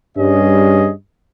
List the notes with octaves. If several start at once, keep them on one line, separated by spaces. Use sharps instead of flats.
G2 G3 C#4 G#4 D#5